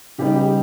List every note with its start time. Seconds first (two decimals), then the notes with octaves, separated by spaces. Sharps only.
0.18 C#3 G3 B3 D#4 G4
0.36 G4